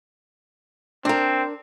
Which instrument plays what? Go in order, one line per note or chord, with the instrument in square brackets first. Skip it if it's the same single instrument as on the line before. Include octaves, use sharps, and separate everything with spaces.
[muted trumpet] C4 [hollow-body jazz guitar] D4 A#4